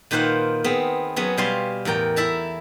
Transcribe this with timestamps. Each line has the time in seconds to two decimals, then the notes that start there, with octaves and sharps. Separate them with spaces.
0.11 A#2 D#3 B4 C5 F5 F#5
0.64 B3 C4 G#4
1.16 F#3 B3 C#4 G#4
1.37 B2 G3 F5 G#5 C6
1.85 E2 A2 A#4 G5
2.16 E4 E5 A5 A#5